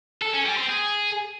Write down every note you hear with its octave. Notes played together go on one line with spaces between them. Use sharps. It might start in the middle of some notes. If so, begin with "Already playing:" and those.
A4
C#4
G3
C4
G#4